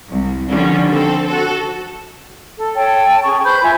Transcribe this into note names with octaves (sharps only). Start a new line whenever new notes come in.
C2
D3 D#3 F3 G3 C#4
C4 A4
F#4 A4
A4
A4 C#5 G5 A5
C#4 G#4 C#6
B4 C5 B5 G6
F4 E5 G#5